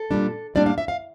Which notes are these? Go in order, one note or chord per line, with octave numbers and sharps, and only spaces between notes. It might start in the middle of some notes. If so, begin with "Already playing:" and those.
Already playing: A4
A#2 G3 D4
A2 G3 A#3 D4 D5
F5
E5
F5